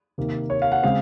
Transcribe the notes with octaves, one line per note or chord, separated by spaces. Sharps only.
C3 D#3 A#3
C#5
F5
F#5
C#3 G#3 C4 F5